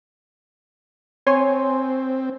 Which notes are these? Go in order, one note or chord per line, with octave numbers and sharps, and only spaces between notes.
C4 C#5 G#5 C6